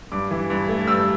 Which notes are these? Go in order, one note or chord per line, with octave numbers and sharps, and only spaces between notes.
G2 D6
E3
G2
A3
G2 E6